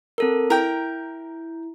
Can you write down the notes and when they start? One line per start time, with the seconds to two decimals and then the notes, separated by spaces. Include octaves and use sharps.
0.18 C4 A4 A#4
0.50 E4 A#4 G5